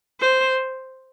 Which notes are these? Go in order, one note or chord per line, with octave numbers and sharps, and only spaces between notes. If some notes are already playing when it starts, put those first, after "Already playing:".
C5